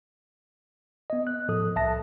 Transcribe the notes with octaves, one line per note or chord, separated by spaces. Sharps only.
B3 D#5
F#6
A2 F3 A4 D#6
C2 E5 A5 A#6